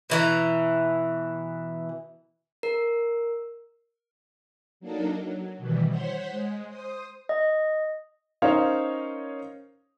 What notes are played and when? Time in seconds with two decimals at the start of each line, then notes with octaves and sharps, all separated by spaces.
0.10 B2 E3 A#5
2.63 A#4
4.80 F#3 A#3 D4 D#4 A4 A#4
5.16 F#3
5.57 B2 D#3 E3 G3
5.90 C5 C#5 F#5 C6 G6 B6
6.29 G#3
6.68 C5 D#6
7.29 D#5
8.42 C#4 D#4 A#4 C5 C#5 F5